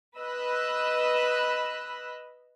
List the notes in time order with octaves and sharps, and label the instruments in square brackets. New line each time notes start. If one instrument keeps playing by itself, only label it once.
[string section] B4 D#5 B5 E6 F#6